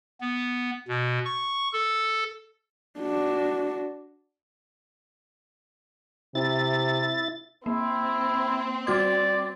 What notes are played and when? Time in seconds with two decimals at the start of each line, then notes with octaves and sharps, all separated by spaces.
0.21 B3
0.88 B2
1.25 C#6
1.73 A4
3.00 D4 F#4
6.35 C3 E4 A6
7.66 A#3 C4 E4
8.87 G3 F#4 D5 G#6